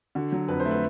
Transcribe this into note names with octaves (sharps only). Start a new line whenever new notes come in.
D3 F#4
F#3
F2 B4
C5
A3
B4